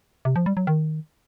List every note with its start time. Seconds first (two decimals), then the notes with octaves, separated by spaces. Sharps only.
0.25 C3
0.36 F3
0.46 G3
0.57 F#3
0.67 D#3